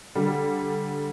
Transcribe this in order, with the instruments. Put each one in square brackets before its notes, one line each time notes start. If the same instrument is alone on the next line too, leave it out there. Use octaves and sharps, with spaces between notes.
[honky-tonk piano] D3 G3